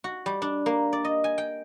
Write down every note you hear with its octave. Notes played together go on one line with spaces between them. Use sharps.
F#4
G3
D4
A#3
D5
D#5
G#5
G5